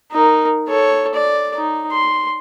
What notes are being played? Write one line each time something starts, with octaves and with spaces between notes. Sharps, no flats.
D#4 A#4
A4 C#5
D5
D#4
C6